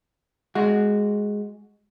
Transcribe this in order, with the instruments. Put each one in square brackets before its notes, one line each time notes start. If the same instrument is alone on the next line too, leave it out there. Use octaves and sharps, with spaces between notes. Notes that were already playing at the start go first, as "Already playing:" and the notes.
[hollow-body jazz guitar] G#3 F#4